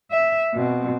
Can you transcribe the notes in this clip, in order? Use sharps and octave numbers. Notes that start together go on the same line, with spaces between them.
E5
B2 C4